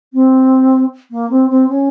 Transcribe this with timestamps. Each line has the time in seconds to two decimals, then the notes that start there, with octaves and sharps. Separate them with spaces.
0.13 C4
1.11 A#3
1.30 C4
1.49 C4
1.69 C#4